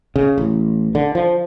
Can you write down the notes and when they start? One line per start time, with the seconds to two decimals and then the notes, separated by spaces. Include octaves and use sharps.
0.16 C#3
0.38 A1
0.95 D3
1.15 F3